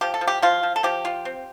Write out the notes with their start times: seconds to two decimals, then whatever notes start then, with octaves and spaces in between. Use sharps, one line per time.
0.01 F3 G4
0.14 A4
0.21 F3
0.27 G4
0.42 F3 F4
0.63 F3
0.76 A4
0.83 F3 G4
1.05 F4
1.25 C4